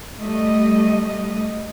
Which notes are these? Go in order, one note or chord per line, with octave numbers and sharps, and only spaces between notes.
G3 A3 D#5